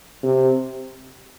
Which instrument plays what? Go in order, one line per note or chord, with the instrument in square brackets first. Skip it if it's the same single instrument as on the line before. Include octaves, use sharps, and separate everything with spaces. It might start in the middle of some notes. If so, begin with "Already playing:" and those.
[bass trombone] C3